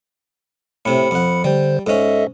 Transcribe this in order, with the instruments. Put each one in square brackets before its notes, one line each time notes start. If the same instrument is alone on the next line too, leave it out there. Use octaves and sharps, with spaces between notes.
[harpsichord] A2 C3 [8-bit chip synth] B5 C#7
[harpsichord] F2 F#5
[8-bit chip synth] D3 C5 [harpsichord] G3
[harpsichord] G#2 C#4 [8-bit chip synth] A4 D#5 E5